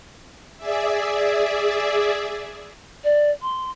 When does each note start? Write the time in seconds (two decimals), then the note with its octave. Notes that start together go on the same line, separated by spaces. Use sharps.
0.57 G#4 D5 E5
3.04 D5
3.42 C6